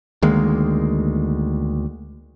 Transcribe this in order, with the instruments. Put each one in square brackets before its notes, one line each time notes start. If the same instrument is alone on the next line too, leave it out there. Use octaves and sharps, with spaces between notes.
[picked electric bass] D2 D#3 G#3 A#3